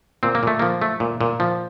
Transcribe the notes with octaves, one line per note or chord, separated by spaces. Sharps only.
A#2 C4
A#3
A#2 A3
F3 A#3
A3
A#2
A#2
F3